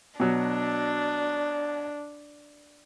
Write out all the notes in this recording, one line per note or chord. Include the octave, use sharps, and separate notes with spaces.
B2 F#3 D4